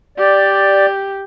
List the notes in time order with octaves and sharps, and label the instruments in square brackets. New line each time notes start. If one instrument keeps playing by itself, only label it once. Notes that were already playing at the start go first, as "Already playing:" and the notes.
[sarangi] G4 [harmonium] D5